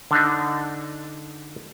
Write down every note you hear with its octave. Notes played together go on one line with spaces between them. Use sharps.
D3 D4 D#4